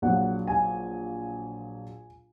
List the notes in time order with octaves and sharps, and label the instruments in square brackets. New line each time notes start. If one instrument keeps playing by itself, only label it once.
[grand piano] A#1 A#2 F#3 F#5
G#5